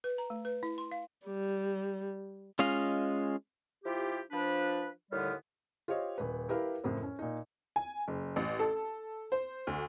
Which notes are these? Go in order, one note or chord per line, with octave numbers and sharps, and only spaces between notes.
B4
A#5
A3
B4
E4
C6
F5
G3
G#3 C#4 F4 D#5 F5
F3 E4 F4 G4
F3 D4 B4
D#2 A2 D3 G3 B3 F6
F4 G4 C5 C#5 D#5
D#1 B4
E4 G4 A#4 B4 F5
F#1 F2 A2 E4 C5
C#4
A#2 D#4
G#5
F#1
A1
A4
C5
D2